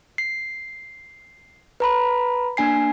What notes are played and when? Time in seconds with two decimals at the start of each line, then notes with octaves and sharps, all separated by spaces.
0.18 C7
1.80 B4 A#5 B5
2.57 A#3 D4 G#5 C7